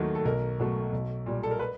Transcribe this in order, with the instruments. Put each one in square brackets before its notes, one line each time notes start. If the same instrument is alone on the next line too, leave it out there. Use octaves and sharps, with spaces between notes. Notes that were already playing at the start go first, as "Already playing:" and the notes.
Already playing: [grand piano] D#2 D#3 F#3 A3
A4
B1 A#4
B2 F#3 A3
B1
A#2 G3
A4
A#4
B4